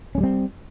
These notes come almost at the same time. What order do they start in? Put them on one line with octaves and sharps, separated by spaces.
C#4 G#3 G3 C4